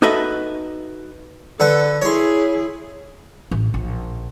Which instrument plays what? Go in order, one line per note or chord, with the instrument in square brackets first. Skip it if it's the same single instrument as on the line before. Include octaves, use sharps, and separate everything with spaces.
[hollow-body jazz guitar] D#4 F#4 A4 B4 D#5 E5
[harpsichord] D3 B4 [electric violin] A4
[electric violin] E4 G#4 [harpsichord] C#5 C6
[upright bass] A1
A#1